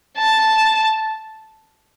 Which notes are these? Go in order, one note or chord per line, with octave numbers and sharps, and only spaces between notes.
A5